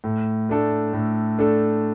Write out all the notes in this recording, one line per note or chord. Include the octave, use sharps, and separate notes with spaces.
A2
A3 D4 A4
A2
A3 D4 A4